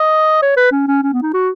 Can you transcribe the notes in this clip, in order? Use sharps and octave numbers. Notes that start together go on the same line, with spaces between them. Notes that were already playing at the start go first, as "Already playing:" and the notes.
Already playing: D#5
C#5
B4
C#4
C#4
C#4
B3
D#4
F#4